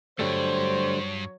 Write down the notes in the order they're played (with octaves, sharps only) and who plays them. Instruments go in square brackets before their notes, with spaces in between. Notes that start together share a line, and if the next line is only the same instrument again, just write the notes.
[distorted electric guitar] G2 [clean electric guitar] D3 G3 A3 [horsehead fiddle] F#3 C#5 [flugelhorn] C5